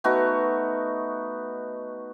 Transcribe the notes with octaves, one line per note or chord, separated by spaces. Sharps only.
A3 B3 D#4 F#4